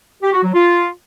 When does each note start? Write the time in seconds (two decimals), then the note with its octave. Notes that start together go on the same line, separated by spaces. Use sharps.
0.22 G4
0.33 F#4
0.43 F#3
0.54 F4